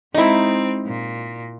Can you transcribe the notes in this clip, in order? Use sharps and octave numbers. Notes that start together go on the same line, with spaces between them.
G#3 C4 D#4 E4
A#2